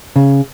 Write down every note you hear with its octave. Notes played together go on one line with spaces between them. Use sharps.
C#3